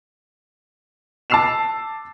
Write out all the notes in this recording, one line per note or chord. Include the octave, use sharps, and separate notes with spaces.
A5 D6 E6 C7 E7 F7